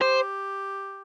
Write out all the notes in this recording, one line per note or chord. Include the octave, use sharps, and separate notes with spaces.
G4 C5